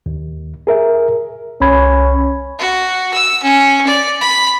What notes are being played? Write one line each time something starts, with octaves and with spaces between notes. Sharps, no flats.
D#2
G#4 A#4 E5
C2 C#4 B5 G#6
F#4
E6
C#4
D5
B5